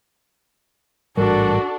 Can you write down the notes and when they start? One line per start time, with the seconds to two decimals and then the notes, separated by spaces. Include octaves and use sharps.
1.17 A1 G#2 G3 D4 F#4 A4 A#4